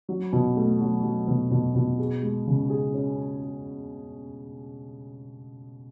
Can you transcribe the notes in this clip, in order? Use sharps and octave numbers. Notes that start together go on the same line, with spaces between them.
F#3
B2
A3
F#3
F#3
B2
B2
B2
G#4
G#3
C#3
G#4
C#4